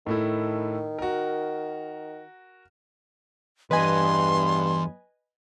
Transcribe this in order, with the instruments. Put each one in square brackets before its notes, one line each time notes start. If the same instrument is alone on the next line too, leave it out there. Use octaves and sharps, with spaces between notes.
[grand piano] A2 A3 E4 [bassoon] D#3
[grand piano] F#4 A#4
[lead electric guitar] E2 [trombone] G2 [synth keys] B4 D#5 G#5 [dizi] C6